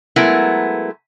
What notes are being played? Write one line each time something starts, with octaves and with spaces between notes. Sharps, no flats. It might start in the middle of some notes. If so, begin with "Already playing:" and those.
F#3 G#3 A3 B3 E4 A#4